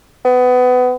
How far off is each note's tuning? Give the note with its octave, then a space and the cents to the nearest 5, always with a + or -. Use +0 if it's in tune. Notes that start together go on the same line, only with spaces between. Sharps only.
B3 +25